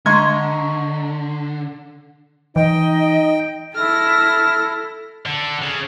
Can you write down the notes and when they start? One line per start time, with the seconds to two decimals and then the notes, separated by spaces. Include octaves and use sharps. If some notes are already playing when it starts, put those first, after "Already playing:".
0.06 D3 G#3 D#5 A#5 C6 C#6 G#6
2.56 E3 D#4 D#5 G5
3.75 E4 A4 F6 A#6
5.26 D3
5.62 C#3